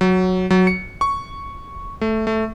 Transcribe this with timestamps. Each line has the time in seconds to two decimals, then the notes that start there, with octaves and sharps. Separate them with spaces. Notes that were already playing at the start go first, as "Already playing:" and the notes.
0.01 F#3
0.51 F#3
0.67 C#7
1.01 C#6
2.01 A3
2.27 A3